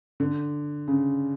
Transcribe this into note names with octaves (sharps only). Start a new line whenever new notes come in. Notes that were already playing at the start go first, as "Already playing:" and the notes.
D3
C#3